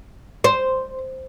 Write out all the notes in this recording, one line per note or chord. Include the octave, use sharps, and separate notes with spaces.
C5